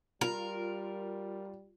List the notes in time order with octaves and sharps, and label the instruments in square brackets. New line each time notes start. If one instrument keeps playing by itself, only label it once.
[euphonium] G3 [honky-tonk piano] F4 [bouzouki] A#4